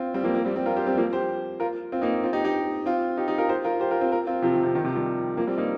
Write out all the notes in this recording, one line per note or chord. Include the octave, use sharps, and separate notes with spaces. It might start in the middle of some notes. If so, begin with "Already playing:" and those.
Already playing: C4 F4
G3 C4
F3 A#3
F3 A#3
G3 C4
G3 C4
F4 A#4
G4 C5
G3 C4
F3 A#3
G4 C5
F4 A#4
C4 F4
A#3 D#4
C4 F4
D#4 G4
D#4 G4
C4 F4
D#4 G4
D#4 G4
F4 A#4
G4 C5
F4 A#4
G4 C5
F4 A#4
C4 F4
F4 A#4
C4 F4
C3 F3
D#3
C3
D#3
C3 F3
D#3 G3
F3 A#3
G3 C4
A#3 D#4